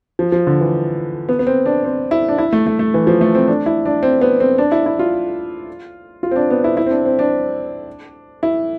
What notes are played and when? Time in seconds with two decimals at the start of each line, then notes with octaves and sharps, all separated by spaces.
0.19 F3
0.32 F3
0.47 D3
0.61 E3
1.29 B3
1.39 B3
1.47 C4
1.66 D4
1.84 C4
2.11 E4
2.29 D4
2.38 E4
2.53 A3
2.66 A3
2.79 A3
2.94 E3
3.07 F3
3.21 A3
3.35 C4
3.48 D4
3.66 E4
3.86 D4
4.03 C4
4.21 B3
4.40 C4
4.58 D4
4.72 E4
4.86 E4
4.99 F4
6.23 F4
6.31 C4
6.36 D4
6.50 B3
6.64 E4
6.77 E4
6.86 C4
6.91 D4
7.06 C4
7.19 D4
8.43 E4